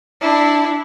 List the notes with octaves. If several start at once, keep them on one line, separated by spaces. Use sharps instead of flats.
D4 E4